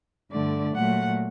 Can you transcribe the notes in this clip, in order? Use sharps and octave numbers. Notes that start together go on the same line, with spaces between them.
G2 D3 A3 D5
A#2 F#3 A3 F#5